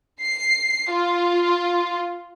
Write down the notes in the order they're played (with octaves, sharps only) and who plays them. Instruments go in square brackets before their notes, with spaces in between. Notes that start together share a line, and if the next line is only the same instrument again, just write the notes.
[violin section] C7
F4